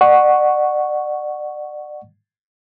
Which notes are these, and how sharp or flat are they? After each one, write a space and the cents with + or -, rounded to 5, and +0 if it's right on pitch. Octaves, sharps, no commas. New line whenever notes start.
D5 +30 F#5 +0 C#6 +0